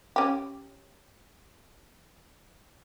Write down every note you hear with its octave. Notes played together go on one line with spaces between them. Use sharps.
C#4 G4